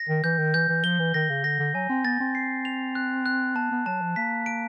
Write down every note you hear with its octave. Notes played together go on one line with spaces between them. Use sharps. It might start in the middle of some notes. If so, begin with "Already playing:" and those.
Already playing: A#6
D#3
E3 G6
D#3
E3 G6
E3
F3 G7
E3
D#3 A#6
C#3
D3 A#6
D3
F#3 G#5
C4
B3 A6
C4
C7
F7
F#6
F#6
B3 A5
B3
F#3 A5
F3
A#3 B6
D7